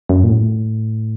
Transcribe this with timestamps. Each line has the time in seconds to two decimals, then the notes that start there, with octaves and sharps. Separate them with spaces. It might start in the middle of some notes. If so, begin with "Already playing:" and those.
0.09 F#2
0.24 A#2
0.29 A2